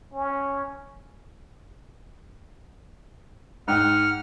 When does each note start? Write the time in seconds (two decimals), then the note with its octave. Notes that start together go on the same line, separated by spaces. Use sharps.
0.13 C#4
3.68 G#2 F#5 G5 F6